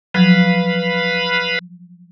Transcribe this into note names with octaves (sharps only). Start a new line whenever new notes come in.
F3 F#3 B4 F5 B5